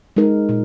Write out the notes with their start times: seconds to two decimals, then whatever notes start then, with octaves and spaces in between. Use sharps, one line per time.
0.16 G#3 D#4 A#4
0.49 A#2